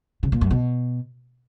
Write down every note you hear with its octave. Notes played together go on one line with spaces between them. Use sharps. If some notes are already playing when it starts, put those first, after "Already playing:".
C#3
A#2
F#2
B2